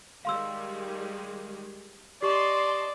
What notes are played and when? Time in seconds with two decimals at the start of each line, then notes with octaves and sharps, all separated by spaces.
0.25 D#3 G3 G#3 F5 C6 E6
2.22 G4 D5 D#5 A5 C6 C#6